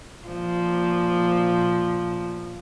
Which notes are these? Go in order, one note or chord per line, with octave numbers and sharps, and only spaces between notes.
A#2 F3